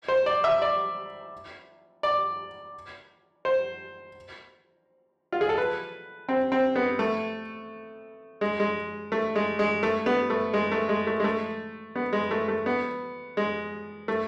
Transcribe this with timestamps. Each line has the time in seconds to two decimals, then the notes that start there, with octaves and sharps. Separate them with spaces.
0.08 C5
0.26 D5
0.44 E5
0.62 D5
2.03 D5
3.45 C5
5.32 F4
5.41 G#4
5.49 A4
5.58 B4
6.29 C4
6.52 C4
6.76 B3
6.99 A3
8.41 G#3
8.60 G#3
9.12 A3
9.35 G#3
9.59 G#3
9.83 A3
10.06 B3
10.30 A3
10.53 G#3
10.72 A3
10.89 G#3
11.07 A3
11.20 G#3
11.24 A3
11.96 B3
12.13 G#3
12.31 A3
12.48 A3
12.66 B3
13.37 G#3
14.08 A3